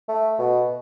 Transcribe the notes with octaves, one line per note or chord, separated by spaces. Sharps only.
A3
B2